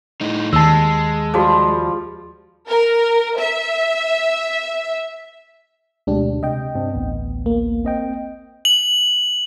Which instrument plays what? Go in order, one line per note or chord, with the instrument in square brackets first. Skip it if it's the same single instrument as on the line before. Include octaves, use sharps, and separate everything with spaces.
[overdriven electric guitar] A2 D#4
[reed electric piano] D#2 A5 [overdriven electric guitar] G#3 [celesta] E6 C7
[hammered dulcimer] F3 G3 [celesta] F#4 G#4
[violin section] A#4
E5
[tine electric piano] D2 B2 [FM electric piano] G#3 D4 G4
[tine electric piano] C3 [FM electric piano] D#5 G5
[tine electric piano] G2 C4 D4
A1 D2 B3
[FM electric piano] A#3
[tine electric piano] C4 D#5 G5
[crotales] F#7